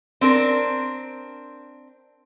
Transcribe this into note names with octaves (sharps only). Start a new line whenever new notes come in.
C4 D4 A#4